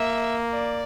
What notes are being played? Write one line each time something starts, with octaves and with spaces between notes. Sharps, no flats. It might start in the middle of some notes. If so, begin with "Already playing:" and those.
Already playing: A#3 E5
D5